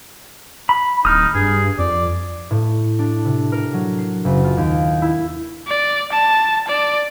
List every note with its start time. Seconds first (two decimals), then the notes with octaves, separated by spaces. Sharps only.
0.69 B5
1.05 D1 D#4 D#6 F6
1.35 G2 G#4
1.79 F2 D5
2.51 A2
2.99 D4
3.25 C3
3.52 A#4
3.74 F#3
3.99 C7
4.25 F#1
4.44 F4
4.57 D#2
5.02 E4
5.68 D5
6.12 A5
6.68 D5